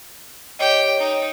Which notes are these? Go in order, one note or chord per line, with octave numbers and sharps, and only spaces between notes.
G4 C#5 D#5 G5
D#4